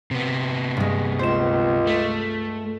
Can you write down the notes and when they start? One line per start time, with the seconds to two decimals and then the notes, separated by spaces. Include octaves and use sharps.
0.11 C3 B3
0.77 G2 G#3
1.19 C#2 C5 E7
1.87 A3